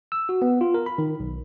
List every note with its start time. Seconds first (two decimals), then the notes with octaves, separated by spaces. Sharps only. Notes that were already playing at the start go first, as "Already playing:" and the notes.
0.12 E6
0.29 F#4
0.42 B3
0.61 F4
0.74 A#4
0.86 B5
0.98 D#3
1.20 B1